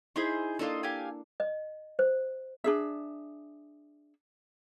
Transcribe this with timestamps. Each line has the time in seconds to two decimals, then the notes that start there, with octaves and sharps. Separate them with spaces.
0.16 D#4 E4 G#4 C5 B5 C6
0.59 A#3 D4 F4 A4 D#5
0.83 G4 F5 G#5
1.40 D#5
1.99 C5
2.64 D4 G#4 E5